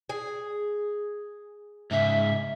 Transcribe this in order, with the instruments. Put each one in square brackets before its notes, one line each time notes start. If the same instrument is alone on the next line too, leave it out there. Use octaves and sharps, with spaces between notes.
[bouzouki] G#4
[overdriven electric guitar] G#2 C#3 [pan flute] E5